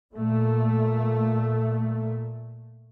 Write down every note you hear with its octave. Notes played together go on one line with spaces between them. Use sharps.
A#2 A3